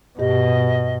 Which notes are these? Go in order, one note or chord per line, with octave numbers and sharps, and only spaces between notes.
G2 B2 G4 D#5